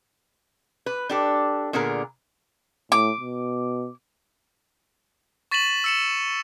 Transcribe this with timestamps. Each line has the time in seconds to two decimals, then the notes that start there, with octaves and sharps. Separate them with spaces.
0.86 B4
1.09 D4 G4 A4
1.73 A#2 D3 B3 G#4 A#4
2.92 A2 D6
3.20 B2
5.51 C#6 A6 B6 D#7 E7 F#7
5.84 E6 C#7 E7